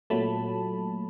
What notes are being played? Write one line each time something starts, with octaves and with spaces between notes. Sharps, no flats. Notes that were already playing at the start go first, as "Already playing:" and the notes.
A#2 F#3 A3 A5 B5